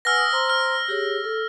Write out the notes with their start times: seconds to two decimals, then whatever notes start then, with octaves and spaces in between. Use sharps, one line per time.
0.05 B4 F#5 G#5 E6 F6 A#6
0.17 D#6
0.32 C5 A#5 C6
0.49 F6
0.88 G4 G#4 C#5
1.24 A4